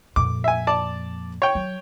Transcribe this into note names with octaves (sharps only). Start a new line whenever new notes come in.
F2 A#2 D6
E5 G#5
D5 A5
C#5 G5
F#3